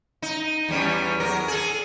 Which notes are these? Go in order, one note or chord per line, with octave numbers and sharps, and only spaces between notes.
D#4
E2 G3 C#4
E2 F#3 A#4
G#4 A4